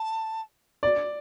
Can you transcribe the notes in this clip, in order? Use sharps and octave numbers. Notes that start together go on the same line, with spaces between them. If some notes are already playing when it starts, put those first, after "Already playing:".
Already playing: A5
D5